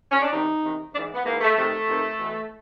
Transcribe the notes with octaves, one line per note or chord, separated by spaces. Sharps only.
C#4
D4
E2 C3 D#3 D#4
E2 C3 D#3
G#2 E3 D4
B3
G#2 E3 A#3
A3
F2 C3 D#3 A3
F2 C3 D#3
E2 B2